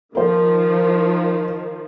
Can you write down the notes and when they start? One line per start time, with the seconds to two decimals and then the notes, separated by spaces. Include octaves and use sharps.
0.15 D#3 F3 A#4 C5